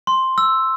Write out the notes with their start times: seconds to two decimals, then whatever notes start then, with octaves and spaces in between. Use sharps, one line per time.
0.07 C6
0.38 E6